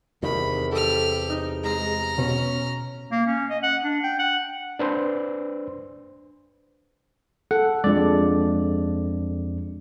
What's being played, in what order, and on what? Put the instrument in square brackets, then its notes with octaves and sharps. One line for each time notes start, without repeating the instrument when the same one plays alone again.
[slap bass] E2 C3 [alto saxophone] D#3 [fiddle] B5
[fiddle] G4 F6 [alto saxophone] A4
[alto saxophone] D#4
[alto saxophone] G#3 [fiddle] A#5 F6
[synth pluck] B2 [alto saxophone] C#4
[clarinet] A#3
C#4
D#5
F#5
D4
G5
F#5
[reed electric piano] D4 B4 C5 C6
[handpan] A4 [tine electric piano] F#5
[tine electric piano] F2 D5 [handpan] G#3 D4